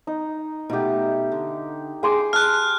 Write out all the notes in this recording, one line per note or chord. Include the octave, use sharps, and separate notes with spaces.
D#4
B2 A3 D#4 G4
D3
G#4 G5 C6 D6
A5 F6 F#6